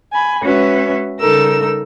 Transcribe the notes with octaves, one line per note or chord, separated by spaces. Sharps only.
G#5 B5
G#3 C#4 F#4 B4 E5
C#3 G3 D#4 A4 A#4 E6